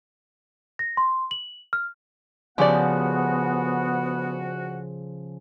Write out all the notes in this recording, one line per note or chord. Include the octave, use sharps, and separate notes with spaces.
A#6
C6
F#7
F6
D2 C#3 F3 B3 F#4 G4 D5 F#5